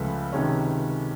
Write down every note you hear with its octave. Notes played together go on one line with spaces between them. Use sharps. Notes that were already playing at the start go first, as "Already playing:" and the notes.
Already playing: C#2 C#3 F3 A3 A4 B4
C3 D#3 G#3 C#4